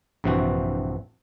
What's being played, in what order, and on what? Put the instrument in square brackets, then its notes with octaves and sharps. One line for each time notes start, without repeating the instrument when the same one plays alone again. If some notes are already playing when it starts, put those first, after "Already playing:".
[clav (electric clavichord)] A#1 G2 C3 E3 C4 F#4